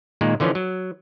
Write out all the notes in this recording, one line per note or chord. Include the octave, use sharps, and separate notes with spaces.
A#2 D#3 G#3 A#3
D3 E3 F3 C#4
F#3